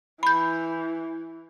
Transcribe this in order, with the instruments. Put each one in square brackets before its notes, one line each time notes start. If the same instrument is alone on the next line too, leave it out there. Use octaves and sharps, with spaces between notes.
[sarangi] E3 [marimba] B5 G6